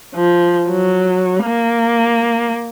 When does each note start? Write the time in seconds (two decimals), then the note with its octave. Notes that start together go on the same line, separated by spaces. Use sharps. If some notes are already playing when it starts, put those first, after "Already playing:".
0.15 F3
0.70 F#3
1.44 A#3